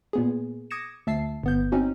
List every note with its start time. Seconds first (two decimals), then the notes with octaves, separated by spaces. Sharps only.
0.13 A#2 B3 G#4
0.71 D6 D#6 G#6 A#6 C#7 E7
1.07 D2 E5 A5 E6 C7
1.43 G1 B3 G6
1.72 C4 C#4 D#4 F#4